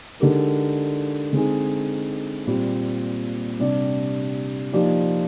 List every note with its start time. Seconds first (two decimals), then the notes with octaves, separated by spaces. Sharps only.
0.20 D3 G#3 D#4 G4 A#4
1.33 D3 G#3 C4 D#4 G#4
2.46 A#2 G3 C4
3.59 C3 G3 D4 G4 D5
4.73 F3 A#3 D#4 G4 D5